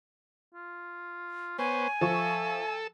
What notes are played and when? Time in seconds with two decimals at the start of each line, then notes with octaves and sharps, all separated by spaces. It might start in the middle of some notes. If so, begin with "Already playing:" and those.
0.54 F4
1.59 B3 C5 C#5 G#5
2.01 F3 A4 E5 C#6 E6